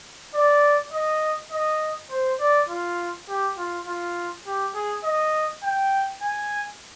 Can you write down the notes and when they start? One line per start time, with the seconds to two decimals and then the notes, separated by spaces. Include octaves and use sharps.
0.35 D5
0.93 D#5
1.52 D#5
2.10 C5
2.40 D5
2.69 F4
3.29 G4
3.57 F4
3.87 F4
4.46 G4
4.75 G#4
5.04 D#5
5.63 G5
6.22 G#5